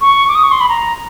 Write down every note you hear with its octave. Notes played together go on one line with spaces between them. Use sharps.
C#6
D6
D#6
C#6
C6
B5
A#5